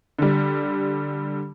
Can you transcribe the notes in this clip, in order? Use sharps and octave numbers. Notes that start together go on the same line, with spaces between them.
D3 G3